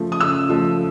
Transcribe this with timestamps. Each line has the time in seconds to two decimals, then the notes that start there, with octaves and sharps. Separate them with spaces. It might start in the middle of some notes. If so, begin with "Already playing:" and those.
Already playing: C#3 F3 A3
0.12 D#6
0.21 C#3 E6
0.49 F3 A3